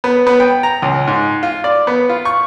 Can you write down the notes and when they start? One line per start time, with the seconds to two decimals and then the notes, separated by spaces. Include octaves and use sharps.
0.04 B3
0.27 B3
0.40 G5
0.63 A#5
0.82 C#2
1.07 G#2
1.43 F4
1.64 D5
1.87 B3
2.09 F4
2.25 C#6